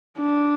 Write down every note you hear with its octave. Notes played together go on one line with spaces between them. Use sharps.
D4